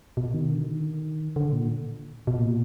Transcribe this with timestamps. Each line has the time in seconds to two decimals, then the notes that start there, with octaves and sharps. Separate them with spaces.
0.17 B2
0.34 D#3
0.51 D3
0.67 D#3
1.36 D3
1.52 A#2
2.27 B2
2.39 A#2